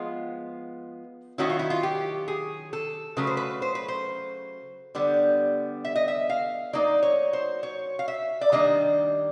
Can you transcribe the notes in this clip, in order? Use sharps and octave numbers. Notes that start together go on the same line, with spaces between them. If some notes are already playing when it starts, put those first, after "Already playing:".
Already playing: F3 G#3 B3 F4
D#3 F#3 A#3 C#4 E4 F#4
F4
E4
F4
G4
G#4
A4
C#3 F#3 A3 B4
C5
B4
C5
B4
C5
D3 G3 B3
E5
D#5
E5
F5
F#3 A#3 D#4 D5
C#5
C5
C#5
F5
E5
D5
D#3 G3 A#3 D4 D#5